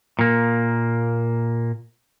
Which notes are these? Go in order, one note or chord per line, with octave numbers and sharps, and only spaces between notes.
A#2 A#3